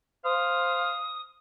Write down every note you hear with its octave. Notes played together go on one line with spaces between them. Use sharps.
C5 F5 D#6